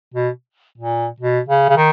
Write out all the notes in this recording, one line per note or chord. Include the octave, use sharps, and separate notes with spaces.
B2
A#2
B2
C#3
C#3
D#3